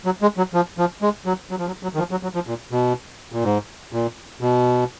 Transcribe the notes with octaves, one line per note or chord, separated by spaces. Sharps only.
F#3
G#3
F#3
F3
F3
G#3
F#3
F#3
F3
F#3
F#3
D#3
F3
F#3
F#3
F3
A#2
B2
A#2
G#2
A#2
B2